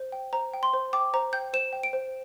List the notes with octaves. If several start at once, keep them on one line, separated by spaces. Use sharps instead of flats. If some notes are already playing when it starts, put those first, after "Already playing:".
Already playing: C5
G5
C5 A#5
G5
C6
C5
G5 D6
C5 A#5
G5 G6
C5 E7
G5
D7
C5